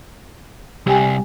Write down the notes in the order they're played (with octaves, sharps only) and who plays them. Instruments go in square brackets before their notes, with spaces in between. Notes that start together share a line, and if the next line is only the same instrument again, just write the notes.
[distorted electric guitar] C2 [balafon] G4 G5 G#5